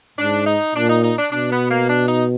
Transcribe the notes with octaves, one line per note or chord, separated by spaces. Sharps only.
G#2 D4
D#4
A#2 D4
D#4
D#4
D4
B2 D4
B3
A#3
D4
D#4